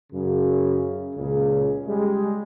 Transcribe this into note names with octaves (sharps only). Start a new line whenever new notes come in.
F#2 C#3
C#2 A#2 C#3
G3 G#3